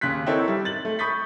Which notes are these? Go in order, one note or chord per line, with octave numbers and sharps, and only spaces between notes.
D#2 C#3 C6 F#6 B6
C4 D#4 E4 A4 A#4 C#5
G3
A6 F#7
A3
B5 C#6 D#6 G6 A6 B6